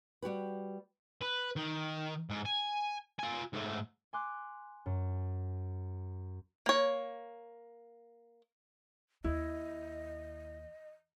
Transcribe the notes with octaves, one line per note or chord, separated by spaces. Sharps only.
G3 F#4 G4 B4
B4
D#3
G#2
G#5
F4 G#5
G#2 A3
G#5 C6 D6 F#6
F#2
A#3 C#5
D#2 E4 D#5